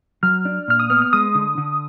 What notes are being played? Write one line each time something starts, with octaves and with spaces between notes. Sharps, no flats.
F#3 F6
D4
A#2 F6
D#6
B3 F6
F6
G#3 D#6
D3
D3